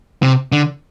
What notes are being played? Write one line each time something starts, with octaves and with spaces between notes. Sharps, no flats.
C3
D3